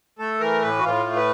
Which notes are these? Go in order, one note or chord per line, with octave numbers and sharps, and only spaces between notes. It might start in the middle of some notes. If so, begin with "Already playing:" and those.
A3 A4
E3 A#4
A2 B4
F#4
A2 F4
A3
B4